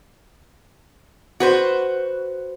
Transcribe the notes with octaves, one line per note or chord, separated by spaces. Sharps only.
F#4 B4 C5